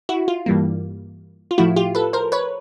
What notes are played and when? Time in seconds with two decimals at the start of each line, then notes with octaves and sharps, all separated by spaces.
0.09 E4 F#4
0.28 F4
0.46 G2 E3 G3 A#3
1.51 F4
1.58 A2 F3 A3 E4 F#4
1.76 F4 G4
1.95 A4 B4
2.13 A#4 C5
2.32 B4 C#5